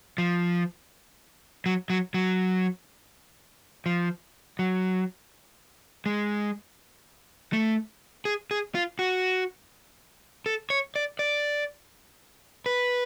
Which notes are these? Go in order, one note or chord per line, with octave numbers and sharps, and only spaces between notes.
F3
F#3
F#3
F#3
F3
F#3
G#3
A3
G#4
G#4
F4
F#4
A4
C#5
D5
D5
B4